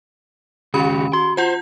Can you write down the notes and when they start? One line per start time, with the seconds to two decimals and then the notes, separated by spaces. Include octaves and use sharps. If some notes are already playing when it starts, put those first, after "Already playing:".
0.74 C#2 D#3 C#4 F#4 G4 B5
1.13 F#4 C6
1.37 F4 C5 F#5 G6